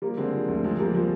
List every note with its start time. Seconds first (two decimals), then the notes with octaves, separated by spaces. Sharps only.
0.02 F3 G3 A#3
0.17 D3 G#3 C4
0.33 F3
0.48 D2
0.64 F3 G#3 C4
0.79 F3 G3 A#3
0.95 F3 G#3